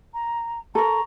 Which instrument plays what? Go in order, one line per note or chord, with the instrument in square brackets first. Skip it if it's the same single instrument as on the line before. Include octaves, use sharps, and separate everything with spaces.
[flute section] A#5
[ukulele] A4 A#4 [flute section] A#5 C6 C#6